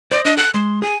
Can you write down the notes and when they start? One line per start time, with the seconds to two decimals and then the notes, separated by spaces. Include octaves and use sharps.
0.12 C5 D5 D#5
0.25 D4 D#5
0.37 A4 F#6
0.54 G#3 C6
0.82 G#4 G#5